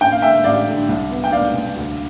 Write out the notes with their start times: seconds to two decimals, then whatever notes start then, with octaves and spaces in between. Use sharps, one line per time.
0.01 A1 G5
0.12 F5
0.22 D3 E5 G5
0.44 A1 D5 F5
0.67 D3
0.89 C2
1.11 B3
1.24 G5
1.32 B3 D5 F5
1.54 C2
1.76 D2